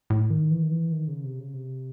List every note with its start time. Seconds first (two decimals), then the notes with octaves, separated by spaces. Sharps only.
0.10 A2
0.30 D#3
0.51 E3
0.63 D#3
0.71 E3
0.92 D#3
1.08 C#3
1.24 C3
1.39 C#3
1.54 C3